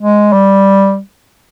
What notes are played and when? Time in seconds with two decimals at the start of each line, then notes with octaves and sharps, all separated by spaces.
0.01 G#3
0.33 G3